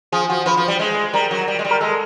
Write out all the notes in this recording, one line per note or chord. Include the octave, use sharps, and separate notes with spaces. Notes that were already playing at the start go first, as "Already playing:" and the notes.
F3 G#4
F3 F#4
F3 B4
F3
G3
G#3
G3 A#4
F#3
G3
G#3
G3
A#4
G#3 A4